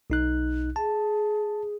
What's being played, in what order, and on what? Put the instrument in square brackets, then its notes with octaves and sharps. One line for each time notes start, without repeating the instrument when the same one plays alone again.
[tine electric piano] B1 D#4 F#6
[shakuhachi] G#4 [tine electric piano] A5